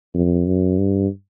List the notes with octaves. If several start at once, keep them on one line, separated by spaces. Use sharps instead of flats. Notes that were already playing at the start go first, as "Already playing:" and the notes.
F2
F#2
G2